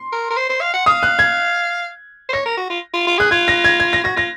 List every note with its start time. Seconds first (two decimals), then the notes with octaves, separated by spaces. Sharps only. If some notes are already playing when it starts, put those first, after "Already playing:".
Already playing: C6
0.12 A#4
0.30 A#4
0.37 C5
0.49 C5
0.61 F5
0.74 F#5
0.86 F5 D#6
1.03 F#6
1.19 G#6
2.29 C5
2.33 C#5 A#6
2.46 A#4
2.57 F#4
2.70 F4
2.94 F4
3.07 F4
3.18 G#4 F#6
3.31 F4 G#6
3.48 A#6
3.64 G#6
3.80 G#6
3.93 A#6
4.04 F#4 A#6
4.16 F4 A#6